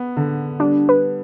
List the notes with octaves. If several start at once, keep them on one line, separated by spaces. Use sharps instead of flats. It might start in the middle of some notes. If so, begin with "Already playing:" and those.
Already playing: B3
D3
G3 D4
B4